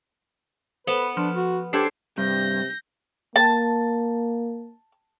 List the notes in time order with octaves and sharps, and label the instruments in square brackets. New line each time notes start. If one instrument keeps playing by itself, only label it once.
[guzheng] B3 [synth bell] A4 C5 [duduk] B4
[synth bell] F3 [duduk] D4
[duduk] F#4
[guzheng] D4 A4 C5 [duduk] G4 [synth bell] G#6 C7
[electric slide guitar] G2 [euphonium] C3 [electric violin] G6 A#6
[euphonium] A#3 [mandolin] A5